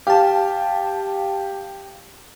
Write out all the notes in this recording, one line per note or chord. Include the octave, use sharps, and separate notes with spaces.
G4 F5 A5